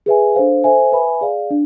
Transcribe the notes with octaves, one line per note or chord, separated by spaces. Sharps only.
G#4 B4 E5 G#5
D4 A4 C5 F5
A4 C5 E5 G#5
B4 E5 G#5 B5
G#4 D5 F5
D4